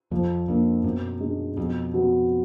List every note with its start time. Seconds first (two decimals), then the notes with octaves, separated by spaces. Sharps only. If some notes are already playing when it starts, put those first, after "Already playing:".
0.11 F2 F3
0.48 F2 A#3 D4
0.84 F#2 B2
1.20 G#3 D4
1.57 F2 B2
1.94 F#3 B3